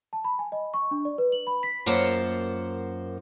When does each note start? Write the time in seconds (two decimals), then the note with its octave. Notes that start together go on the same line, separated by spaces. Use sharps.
0.13 A5
0.24 B5
0.39 G#5
0.52 D#5
0.74 C#6
0.91 D4
1.05 D5
1.18 B4
1.32 F#7
1.47 B5
1.63 B6
1.86 F#2 A#3 F4 C5 F#5 A5